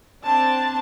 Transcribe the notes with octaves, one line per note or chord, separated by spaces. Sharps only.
C4 D4 A5